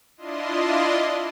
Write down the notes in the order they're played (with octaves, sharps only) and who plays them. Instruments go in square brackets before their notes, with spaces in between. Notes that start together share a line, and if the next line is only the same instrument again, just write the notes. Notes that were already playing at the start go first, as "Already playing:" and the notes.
[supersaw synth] D4 E4 F4 D#5 C6